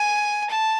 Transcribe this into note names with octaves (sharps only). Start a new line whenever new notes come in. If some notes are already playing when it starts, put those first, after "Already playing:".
Already playing: G#5
A5